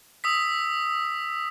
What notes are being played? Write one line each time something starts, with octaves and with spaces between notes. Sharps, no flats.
D#6 E6 B6